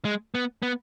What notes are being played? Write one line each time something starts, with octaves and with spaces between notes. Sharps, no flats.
G#3
B3
B3